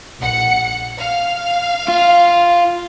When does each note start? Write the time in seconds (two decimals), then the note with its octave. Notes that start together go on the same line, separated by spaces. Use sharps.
0.19 A#1 F#5 C#7
0.99 F5
1.88 F4